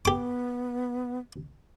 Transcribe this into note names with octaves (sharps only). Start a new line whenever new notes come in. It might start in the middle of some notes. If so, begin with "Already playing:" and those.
B3 G4 D6